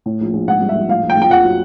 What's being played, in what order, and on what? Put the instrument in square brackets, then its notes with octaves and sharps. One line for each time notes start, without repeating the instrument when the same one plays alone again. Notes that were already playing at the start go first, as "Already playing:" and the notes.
[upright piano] A2
A#1
A#1
G#2 F#5
G3
E5
A#1
A2 F5
A#1
G5
A#1
G5
F2 F#5
F#3